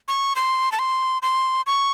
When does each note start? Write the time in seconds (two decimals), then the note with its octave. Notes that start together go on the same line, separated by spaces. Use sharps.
0.08 C#6
0.36 C6
0.72 A5
0.79 C6
1.22 C6
1.67 C#6